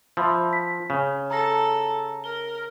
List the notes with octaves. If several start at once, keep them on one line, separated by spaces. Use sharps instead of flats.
F3 E5 B5 E6
B6
C#3
A4 A#5 E6 A#6
A#4 G7